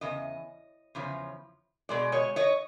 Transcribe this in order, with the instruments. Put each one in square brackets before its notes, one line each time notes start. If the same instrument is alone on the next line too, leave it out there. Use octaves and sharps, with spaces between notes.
[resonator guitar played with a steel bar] E2 C#3 D#5
E2 C#3 F3
B2 G#3 D5
C#5 D#5
C#5 D#5